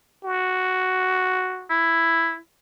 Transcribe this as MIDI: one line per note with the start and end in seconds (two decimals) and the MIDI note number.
0.24 1.70 66
1.70 2.36 64